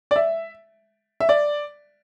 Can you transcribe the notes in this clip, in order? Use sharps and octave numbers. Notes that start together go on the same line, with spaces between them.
D5
E5
E5
D5